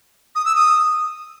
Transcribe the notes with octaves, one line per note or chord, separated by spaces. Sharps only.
D#6
E6
D#6